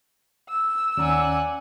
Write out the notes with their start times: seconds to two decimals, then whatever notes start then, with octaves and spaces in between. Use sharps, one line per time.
0.49 E6
0.97 D#2 C#4 D5 F#5 G#5 A#5